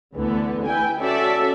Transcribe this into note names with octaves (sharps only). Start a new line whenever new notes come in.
D2 D3 E3 A3 B3
E4 B4 G5 G#5
C#4 F#4 A4 D5 E5